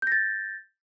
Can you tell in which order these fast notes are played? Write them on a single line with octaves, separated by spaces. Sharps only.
G6 A#6 A6